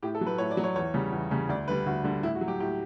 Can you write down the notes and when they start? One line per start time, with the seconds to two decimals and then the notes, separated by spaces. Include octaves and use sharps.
0.03 A2 G4
0.15 A4
0.21 F#3
0.27 B4
0.38 A2 C#5
0.51 D5
0.57 F#3
0.64 C#5
0.76 E2 C#5
0.94 C#3 G3
1.13 E2
1.31 C#3 G3
1.49 D2 D5
1.68 D3 G3 B4
1.86 D2 F#4
2.04 D3 G3
2.23 A2 E4
2.35 F#4
2.41 F#3
2.48 G4
2.60 A2 G4